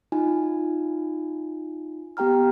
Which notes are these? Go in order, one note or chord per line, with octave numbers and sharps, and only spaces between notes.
D#4 F4 G#5
B3 G4 G5 A#5 F6